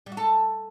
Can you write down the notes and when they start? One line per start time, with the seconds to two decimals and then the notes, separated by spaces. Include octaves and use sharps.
0.06 G3
0.12 F#4
0.17 A4